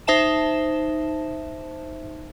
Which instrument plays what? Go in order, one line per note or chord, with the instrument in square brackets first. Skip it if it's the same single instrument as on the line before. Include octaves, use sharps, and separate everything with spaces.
[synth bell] D#4 C5 E5 A5 E7